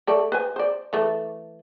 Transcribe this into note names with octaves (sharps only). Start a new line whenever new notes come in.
A3 A4 D5
B4 C5 G#5
C5 D5
E3 A3